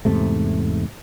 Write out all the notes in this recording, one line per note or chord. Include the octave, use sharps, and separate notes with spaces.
E2 G#2 C3 A3